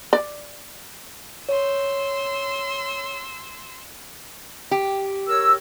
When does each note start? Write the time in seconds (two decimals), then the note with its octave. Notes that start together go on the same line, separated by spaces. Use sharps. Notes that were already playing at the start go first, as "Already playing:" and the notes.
0.13 D5
1.49 C#5 C6 E6
4.71 G4
5.29 A#4 C#5 E6